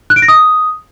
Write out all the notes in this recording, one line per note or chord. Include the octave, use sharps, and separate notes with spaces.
F#6
D7
A#6
D#6